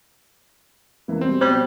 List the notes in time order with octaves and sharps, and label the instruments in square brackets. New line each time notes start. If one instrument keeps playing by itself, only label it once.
[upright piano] E2 E3 A#3
[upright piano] B2 G3 [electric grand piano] C4
[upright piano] B2 G#6 F#7 [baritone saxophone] G3 [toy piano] C5